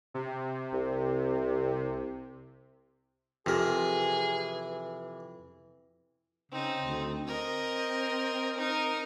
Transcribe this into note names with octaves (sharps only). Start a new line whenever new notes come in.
C3
C2
F2 C3 E3 G#4 A#4
C#3 C4 D#4
D2
C4 A#4 D#5
D#4 A#4